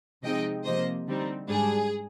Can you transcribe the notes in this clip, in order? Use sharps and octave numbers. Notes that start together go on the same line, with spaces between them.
C3 F3 G#3 C4 D#4 D#5 G5
C3 F3 A#3 C5 D#5
D3 G3 C4 D#4
G#2 G3 D4 G#4